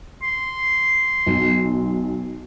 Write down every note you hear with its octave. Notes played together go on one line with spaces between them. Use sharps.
C6
B1